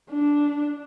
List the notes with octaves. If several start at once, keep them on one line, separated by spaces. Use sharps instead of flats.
D4